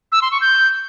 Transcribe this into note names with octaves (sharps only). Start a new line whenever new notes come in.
E6
C6
C#6
G6